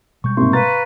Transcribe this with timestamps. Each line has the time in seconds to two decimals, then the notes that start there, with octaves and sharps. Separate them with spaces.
0.24 B2 G3 G#3 C#6 G6
0.37 G#2 C3 A#3 C6 C#6
0.53 B4 F5 A#5 A6